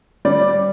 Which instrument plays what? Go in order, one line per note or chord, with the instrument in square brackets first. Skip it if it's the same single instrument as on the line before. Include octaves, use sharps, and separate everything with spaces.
[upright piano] G3 D5